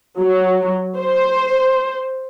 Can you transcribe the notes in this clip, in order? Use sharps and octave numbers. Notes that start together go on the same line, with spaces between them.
F#3
C5